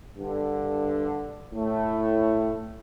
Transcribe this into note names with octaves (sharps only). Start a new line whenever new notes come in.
G2 D3
A2 A3